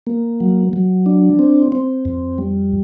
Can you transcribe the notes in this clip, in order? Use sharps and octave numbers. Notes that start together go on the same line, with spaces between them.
A#3
F#3
F#3
D4
C4
C4
F2
G3